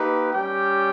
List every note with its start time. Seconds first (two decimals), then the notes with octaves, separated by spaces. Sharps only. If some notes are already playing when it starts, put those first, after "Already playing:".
Already playing: A#3 D#4 G4 B4
0.32 G3 C#4 G4 G5